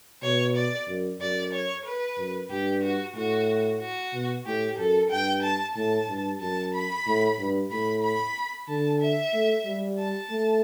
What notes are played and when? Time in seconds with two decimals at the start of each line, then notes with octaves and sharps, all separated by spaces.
0.23 B2 C#5
0.56 D5
0.88 F#2
1.21 F#2 D5
1.53 C#5
1.85 B4
2.18 F#2
2.50 G2 G4
2.83 F#4
3.15 A2 F#4
3.80 F#4
4.14 B2
4.46 A2 G4
4.78 F#2 A4
5.10 G2 G5
5.43 A5
5.76 A2 A5
6.08 G2
6.40 F#2 A5
6.74 B5
7.06 A2
7.39 G2
7.71 A2 B5
8.03 B5
8.68 D3 A5
9.01 E5
9.33 A3
9.65 G3
9.99 A5
10.31 A3